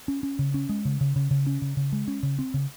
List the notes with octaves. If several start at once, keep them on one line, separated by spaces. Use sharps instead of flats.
C#4
C#4
C#3
C#4
G#3
C#3
C#3
C#3
C#3
C#4
C#3
C#3
G#3
C#4
C#3
C4
C#3